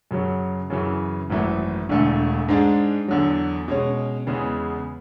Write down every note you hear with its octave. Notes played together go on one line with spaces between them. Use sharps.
F#2 C#3 F#3
F#2 C#3 E3
G#1 F#2 E3 A3
E1 E2 D3 A3
G#2 G#3 D4
E2 D3 F#3
B2 G#3 C#4
E2 C#3 G#3 B3